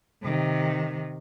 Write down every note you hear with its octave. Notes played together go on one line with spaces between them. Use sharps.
C3 D#3